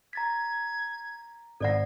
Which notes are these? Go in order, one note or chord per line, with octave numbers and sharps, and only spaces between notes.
A#5 G#6 A6 B6
G#1 A4 D5 F#5 G#6 A#6